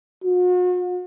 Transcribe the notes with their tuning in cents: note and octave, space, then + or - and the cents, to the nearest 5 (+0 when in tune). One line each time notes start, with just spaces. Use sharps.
F#4 -40